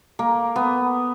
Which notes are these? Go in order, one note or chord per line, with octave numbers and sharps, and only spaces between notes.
A#3
B3